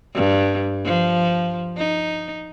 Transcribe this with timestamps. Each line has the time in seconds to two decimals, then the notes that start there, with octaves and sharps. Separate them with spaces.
0.14 G2
0.85 F3
1.77 D#4